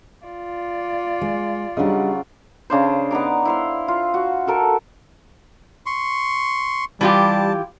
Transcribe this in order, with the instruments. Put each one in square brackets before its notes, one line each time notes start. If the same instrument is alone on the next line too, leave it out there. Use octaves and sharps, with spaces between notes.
[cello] F4 D5
[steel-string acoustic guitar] G#3
[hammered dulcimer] C#3 F#3 [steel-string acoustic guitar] G3 D4 D#5
[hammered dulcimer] C#3 D4 C5
B3 D#4 A#5 D6
E4 C5 F5
F4
F#4
F#4 A4 A#4 A5
[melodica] C6 C#6
[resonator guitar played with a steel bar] E3 F4 G4 [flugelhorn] G3 [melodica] A5